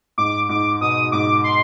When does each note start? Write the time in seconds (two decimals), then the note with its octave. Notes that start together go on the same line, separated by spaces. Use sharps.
0.18 G#2 D6
0.49 G#2 D6
0.81 B2 D#6
1.12 G#2 D6
1.44 C6